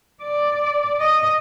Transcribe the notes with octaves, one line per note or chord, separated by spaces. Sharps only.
D5
D#5